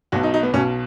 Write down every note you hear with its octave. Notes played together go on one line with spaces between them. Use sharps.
B1 B2 F#4
D#4
D#4
B3
B1 B2 C#4